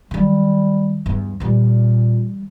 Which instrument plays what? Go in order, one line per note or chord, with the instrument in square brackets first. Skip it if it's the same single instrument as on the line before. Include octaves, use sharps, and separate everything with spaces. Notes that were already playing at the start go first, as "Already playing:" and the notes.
[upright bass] D#3 F#3 [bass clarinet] G3
[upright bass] E2 G2
[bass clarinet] A#2 [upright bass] E3 G3